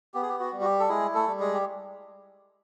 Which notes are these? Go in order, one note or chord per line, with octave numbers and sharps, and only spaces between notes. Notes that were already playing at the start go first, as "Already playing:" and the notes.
B3 G4
G#4
G4
F#4
G3
F#4
G4
A4
G#3 E4 G#4
A3 A4
G3
G#3 G#4
G4